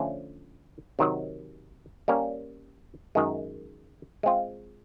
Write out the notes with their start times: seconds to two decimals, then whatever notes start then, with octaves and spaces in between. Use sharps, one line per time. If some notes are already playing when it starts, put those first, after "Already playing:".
Already playing: D3 F3 A3 C#4
0.99 C3 D#3 F#3
2.08 G3 A#3 C#4
3.15 F#2 D#3 G#3
4.23 G#3 C4 F4